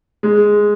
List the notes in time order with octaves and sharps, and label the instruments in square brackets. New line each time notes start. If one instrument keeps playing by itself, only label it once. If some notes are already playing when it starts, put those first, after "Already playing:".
[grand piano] G#3